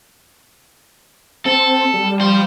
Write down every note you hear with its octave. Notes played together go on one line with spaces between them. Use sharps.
C4 A4
G3
F4 C5